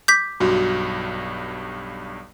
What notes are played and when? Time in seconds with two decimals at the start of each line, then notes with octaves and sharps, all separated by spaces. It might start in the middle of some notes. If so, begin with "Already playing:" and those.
0.08 D6 G6 B6
0.40 B1 G2 F#4